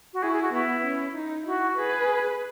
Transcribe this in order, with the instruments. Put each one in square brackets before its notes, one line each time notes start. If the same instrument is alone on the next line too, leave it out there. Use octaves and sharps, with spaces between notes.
[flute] F#4
[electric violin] E4 [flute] G#4
[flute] G#4
F#4
[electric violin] B3 [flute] E4
[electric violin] C#4
D#4
[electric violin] E4 [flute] F#4
[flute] G#4 [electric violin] B4